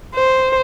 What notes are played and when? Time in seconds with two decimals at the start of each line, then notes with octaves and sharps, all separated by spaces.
0.15 C5